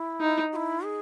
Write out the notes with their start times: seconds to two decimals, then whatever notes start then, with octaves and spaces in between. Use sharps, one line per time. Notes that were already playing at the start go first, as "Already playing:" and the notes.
Already playing: E4
0.20 D#4
0.52 F#4
0.56 E4
0.85 G#4